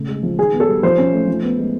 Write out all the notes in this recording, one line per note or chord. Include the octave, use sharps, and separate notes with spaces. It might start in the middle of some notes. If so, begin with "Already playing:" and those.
Already playing: C#3 A3
G#3
F3
D#3 G#4
B3
A4
G3
F3 C5
C#4
A3
F3
B3
G#3